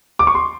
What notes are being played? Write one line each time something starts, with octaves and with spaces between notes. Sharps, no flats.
D6
C#6
C6